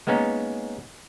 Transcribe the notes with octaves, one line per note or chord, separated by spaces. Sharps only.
G#3 A#3 B3 C#4 D#4